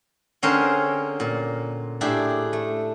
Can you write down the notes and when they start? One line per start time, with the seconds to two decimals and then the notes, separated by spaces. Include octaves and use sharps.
0.43 D3 C4 C#4 G#4 A#4 C5
1.20 A#2
2.01 A2 D4 G4 G#4 E5
2.53 A3